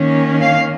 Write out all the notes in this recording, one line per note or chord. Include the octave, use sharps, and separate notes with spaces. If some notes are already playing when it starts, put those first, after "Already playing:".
Already playing: D#3 A#3 C#4
F5